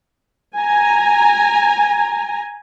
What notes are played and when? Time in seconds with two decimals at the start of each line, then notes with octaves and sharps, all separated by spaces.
0.56 G#5 A#5